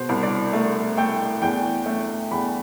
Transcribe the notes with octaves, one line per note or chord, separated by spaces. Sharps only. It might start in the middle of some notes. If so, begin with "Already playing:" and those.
Already playing: B2 C5
C2
D5
A3
A3 G5
E2 G5
A3
E2 B5